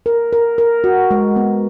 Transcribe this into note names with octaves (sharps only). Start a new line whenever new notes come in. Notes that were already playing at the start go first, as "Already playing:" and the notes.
A#4
A#4
A#4
F#4
G#3
B3